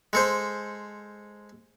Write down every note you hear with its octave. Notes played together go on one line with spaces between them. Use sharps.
G#3 A4 C5